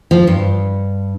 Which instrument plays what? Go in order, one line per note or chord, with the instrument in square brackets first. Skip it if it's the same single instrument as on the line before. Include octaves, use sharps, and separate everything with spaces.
[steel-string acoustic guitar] F3
G2